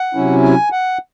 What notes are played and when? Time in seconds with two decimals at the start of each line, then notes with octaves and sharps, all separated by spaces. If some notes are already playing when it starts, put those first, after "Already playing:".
Already playing: F#5
0.15 C3 F#3 C#4 E4
0.43 G#5
0.72 F#5